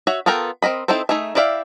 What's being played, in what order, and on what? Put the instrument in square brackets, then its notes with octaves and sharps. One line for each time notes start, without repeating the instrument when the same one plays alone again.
[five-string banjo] F#4 C#5 E5
B3 F4 A4 A#4 G5
C4 A#4 D#5 B5
C4 D#4 E4 A4 C5
A3 D#4 G#4 E5
E4 G4 D5 E5 F5